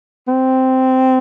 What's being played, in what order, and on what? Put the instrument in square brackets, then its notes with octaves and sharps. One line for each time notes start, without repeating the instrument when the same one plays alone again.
[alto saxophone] C4